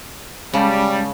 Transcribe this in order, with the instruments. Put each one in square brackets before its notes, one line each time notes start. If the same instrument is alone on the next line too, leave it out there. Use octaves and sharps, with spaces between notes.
[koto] C#3 [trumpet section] G3 [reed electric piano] G#3 C#4 A5